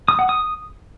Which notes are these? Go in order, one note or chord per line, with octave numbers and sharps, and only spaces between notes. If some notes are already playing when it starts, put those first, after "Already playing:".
D#6
F#5
D#6